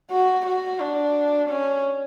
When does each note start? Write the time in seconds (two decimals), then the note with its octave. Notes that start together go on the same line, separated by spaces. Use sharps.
0.11 F#4
0.46 F#4
0.80 D4
1.49 C#4